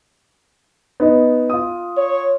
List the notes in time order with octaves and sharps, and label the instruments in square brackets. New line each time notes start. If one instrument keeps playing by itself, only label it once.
[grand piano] B3 D#4
F4 D#6
[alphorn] C#5